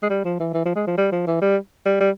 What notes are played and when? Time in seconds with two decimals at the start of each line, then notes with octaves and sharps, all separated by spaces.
0.03 G#3
0.10 G3
0.25 F3
0.40 E3
0.54 E3
0.65 F3
0.75 G#3
0.87 F3
0.98 G3
1.12 F3
1.27 E3
1.41 G3
1.86 G3
2.00 G3